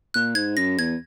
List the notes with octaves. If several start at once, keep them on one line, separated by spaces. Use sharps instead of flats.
A#2 F#6
G#2 G#6
F#2 A#6
E2 G#6